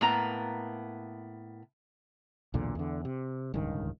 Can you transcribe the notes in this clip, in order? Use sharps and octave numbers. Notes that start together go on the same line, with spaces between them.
A2 A#3 B3 A#5
B1 E2 A#2 D3
E2 D3
C3
D1 C#2 G2 D#3